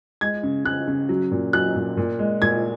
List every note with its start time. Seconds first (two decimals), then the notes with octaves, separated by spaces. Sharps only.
0.21 G#3 G#6
0.43 C#3
0.65 C#3 F#6
0.87 C#3
1.09 F#3
1.32 A#2
1.53 F#3 F#6
1.75 A#2
1.97 A#2
2.19 G#3
2.42 A#2 G#6